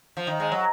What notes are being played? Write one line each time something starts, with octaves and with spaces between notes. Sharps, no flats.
F3
D#3
G#3
F#3